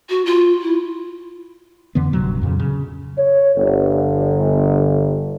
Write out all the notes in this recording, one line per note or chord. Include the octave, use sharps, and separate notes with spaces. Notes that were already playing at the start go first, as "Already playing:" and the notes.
F#4
F4
E4
F2 D3 E3 B3
D1 G2 C3 F#3
F2 A#2 C#3
C#3
C#5
G1